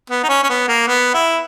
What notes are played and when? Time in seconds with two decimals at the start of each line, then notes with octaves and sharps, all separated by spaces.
0.10 B3
0.24 D#4
0.29 C#4
0.43 C#4
0.49 B3
0.68 A#3
0.88 B3
1.14 E4